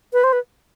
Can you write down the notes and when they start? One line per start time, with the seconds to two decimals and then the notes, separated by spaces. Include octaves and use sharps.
0.13 B4
0.24 C5
0.33 B4